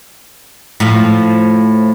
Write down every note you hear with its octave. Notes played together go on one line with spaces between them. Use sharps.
A2 F3 F4